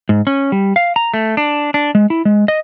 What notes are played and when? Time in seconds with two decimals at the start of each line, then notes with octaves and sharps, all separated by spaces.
0.09 G#2
0.27 C#4
0.52 G3
0.76 F5
0.96 A#5
1.14 A3
1.37 D4
1.74 D4
1.95 G#3
2.10 E4
2.25 G#3
2.48 D#5